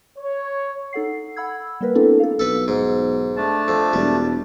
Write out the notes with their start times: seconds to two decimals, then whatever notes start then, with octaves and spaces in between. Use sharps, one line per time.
0.17 C#5
0.93 D#4 A4 F#5 C7
1.36 F#5 B5 E6 G#6
1.81 G3 A#3 A#4 B4
1.95 A3 B3 C4 D4 E4 A4
2.20 A4 F5
2.39 B1 A4 B4
2.68 G#2
3.37 A3 D4 A5
3.68 F2
3.93 E1 G3